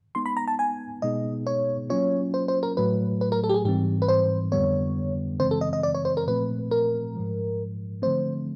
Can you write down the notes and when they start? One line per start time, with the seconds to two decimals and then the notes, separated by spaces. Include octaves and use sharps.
0.15 G#3 B3 D#4 C6
0.26 B5
0.37 A#5
0.48 A5
0.59 G#5
1.02 B2 G#3 B3 D#4 G#4 D#5
1.47 C#5
1.90 F#3 A#3 C#4 F4 C#5
2.34 C5
2.48 C5
2.63 A#4
2.77 A2 F#3 A3 B4
3.21 B4
3.32 A#4
3.44 A4
3.49 G4
3.54 G#4
3.65 G#2 E3 G3 C4 G4
4.02 B4
4.08 C5
4.52 F2 D3 G3 B3 C#5
5.40 F#2 C#3 E3 G#3 C4 C5
5.51 A4
5.61 D#5
5.73 D#5
5.83 D5
5.95 C#5
6.05 C5
6.17 A#4
6.27 A#2 F3 A3 C4 B4
6.71 A#4
7.15 G#2 F3 G#3
8.02 D3 F3 A3 C4 C5